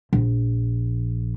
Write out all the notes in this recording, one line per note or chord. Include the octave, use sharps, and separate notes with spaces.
A#1